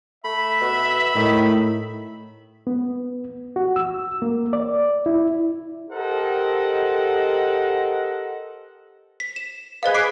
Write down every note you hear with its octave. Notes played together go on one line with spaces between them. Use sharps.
A3 E5 B5
B2
A2 D#3
B3
F#4
E6
A#3
D5
E4
G4 A4 A#4 C5 D#5 F#5
B6
E7
G#4 B4 C5 D#5 F5
D6 C7 D7